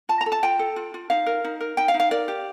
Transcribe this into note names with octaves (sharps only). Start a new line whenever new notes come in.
F4 A5
A#5
A4
A5
F4 G5
A4
F4
F4
D#4 F5
A#4
D#4
A#4
D#4 G5
F5
D#4
F5
A#4 D5
G4